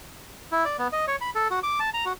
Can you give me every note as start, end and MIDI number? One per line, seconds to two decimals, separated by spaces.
0.52 0.65 64
0.65 0.77 74
0.79 0.88 59
0.93 1.06 75
1.08 1.16 73
1.21 1.30 83
1.35 1.48 69
1.51 1.60 66
1.63 1.79 86
1.80 1.90 81
1.94 2.05 82
2.05 2.13 66